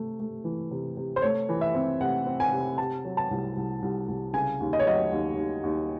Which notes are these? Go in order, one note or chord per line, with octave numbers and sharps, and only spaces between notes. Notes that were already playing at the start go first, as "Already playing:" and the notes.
Already playing: C3 A3
A3
E3
C3
C3
C5
A3 C#5
E3
E5
C4
C3 F#5
C4
G#5
C3
C3 A5
F#3
A5
C2
C2
C2
C2
C#3 G#5
D#2
D#5
C#5
F#3 D#5
D#2
D#2
D#2